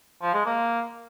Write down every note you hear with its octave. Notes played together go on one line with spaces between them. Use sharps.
F3
G#3
A#3